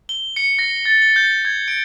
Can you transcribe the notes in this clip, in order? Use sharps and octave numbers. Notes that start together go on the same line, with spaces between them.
G7
C#7
A#6
A6
G7
G6
G#6
D7